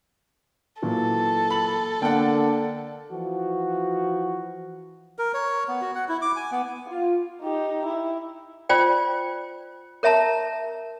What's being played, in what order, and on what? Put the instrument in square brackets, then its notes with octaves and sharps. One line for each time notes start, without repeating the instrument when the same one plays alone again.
[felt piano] A#2 E3 F#3 [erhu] A4
[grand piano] B5 F#7
[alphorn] D3 [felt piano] A#3 [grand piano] F#5 G5
[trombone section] E3 F3 F#4
[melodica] A#4
C#5
B3
F#4
F#5
E4
D6
G#5
B3
[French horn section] F4
[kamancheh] D#4 G4
E4
[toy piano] F4 C5 D5 G5
A#4 C#5 E5 A5 A#5